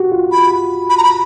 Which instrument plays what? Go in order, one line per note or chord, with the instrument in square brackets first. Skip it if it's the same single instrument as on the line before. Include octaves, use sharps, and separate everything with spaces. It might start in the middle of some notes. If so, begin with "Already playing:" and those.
Already playing: [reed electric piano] F#4 G4
F4
[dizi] B5
B5
A#5
B5